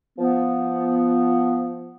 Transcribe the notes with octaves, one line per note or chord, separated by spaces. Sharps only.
F3 B3